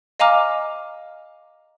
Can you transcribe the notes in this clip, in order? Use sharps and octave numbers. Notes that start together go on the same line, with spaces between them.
D#5 F5 G#5 A#5 D6 F6